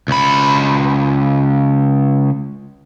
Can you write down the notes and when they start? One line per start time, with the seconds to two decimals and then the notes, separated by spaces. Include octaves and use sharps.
0.08 C#2 B5